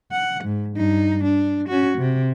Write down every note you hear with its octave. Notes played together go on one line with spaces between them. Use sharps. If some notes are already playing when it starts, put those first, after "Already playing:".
F#5
G#2
G2 D#4
D4
C#4 F#4
C3